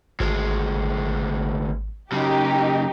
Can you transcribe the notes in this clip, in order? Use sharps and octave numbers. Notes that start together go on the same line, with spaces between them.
G#1 D2 G#3
F#2 C#3 D#4 G4